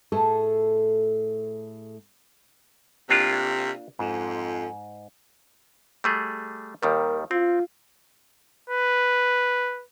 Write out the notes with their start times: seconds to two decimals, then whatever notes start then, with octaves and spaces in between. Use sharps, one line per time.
0.12 A2 A3 G#4 A4 A5
3.09 C3 A#3 D4 F4
3.99 F2 G#2
6.04 G3 A3 G#4
6.83 D#2 D#3 G3 A#4
7.31 C4 F4
8.70 B4